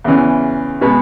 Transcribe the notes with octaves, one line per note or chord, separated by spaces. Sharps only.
E2 C#3 E3
B2 G#3 B3